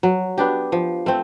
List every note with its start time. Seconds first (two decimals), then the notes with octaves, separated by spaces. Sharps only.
0.03 F#3
0.38 B3 D4 G4
0.72 F3
1.06 A3 C4